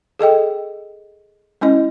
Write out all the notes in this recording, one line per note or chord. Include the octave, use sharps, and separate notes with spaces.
G#4 A4 D#5 G5
G#3 C#4 E4 D#5